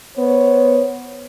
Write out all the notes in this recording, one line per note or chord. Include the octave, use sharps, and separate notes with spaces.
B3 C5 C#5